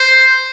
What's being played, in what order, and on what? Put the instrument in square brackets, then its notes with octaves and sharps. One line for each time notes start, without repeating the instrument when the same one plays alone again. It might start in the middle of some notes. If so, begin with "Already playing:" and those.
Already playing: [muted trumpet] C5